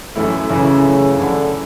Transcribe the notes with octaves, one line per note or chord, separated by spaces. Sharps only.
F#2 A2 E3 A3 E4
F#2 C#3 E3 A3 E4
F#2 E3 A3 E4
F#2 D3 E3 A3 E4